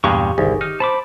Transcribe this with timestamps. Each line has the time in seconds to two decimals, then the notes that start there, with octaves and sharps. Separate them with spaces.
0.04 E2 G2 A#2 G#3 G4 C#6
0.38 G1 C2 D#3 G#4
0.61 D#4 F6
0.80 C5 A5 B5 D6